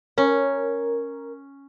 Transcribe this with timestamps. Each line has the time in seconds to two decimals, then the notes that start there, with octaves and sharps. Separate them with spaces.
0.18 C#4 A#4